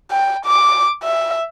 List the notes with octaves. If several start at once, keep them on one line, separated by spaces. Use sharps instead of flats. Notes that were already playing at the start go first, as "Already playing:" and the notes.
G5
D6
E5